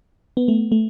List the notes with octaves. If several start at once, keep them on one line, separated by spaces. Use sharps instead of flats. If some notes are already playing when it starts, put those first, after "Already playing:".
B3
A3
A3